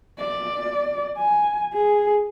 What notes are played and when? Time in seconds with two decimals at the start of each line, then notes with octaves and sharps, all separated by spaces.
0.20 D5
1.18 G#5
1.74 G#4